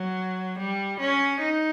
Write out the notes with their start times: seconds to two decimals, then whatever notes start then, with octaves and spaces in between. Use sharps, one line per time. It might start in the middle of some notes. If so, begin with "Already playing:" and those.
Already playing: F#3
0.59 G3
1.00 C#4
1.40 D#4